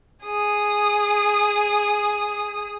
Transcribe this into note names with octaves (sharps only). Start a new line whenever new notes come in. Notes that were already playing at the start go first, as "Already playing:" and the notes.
G#4 D#6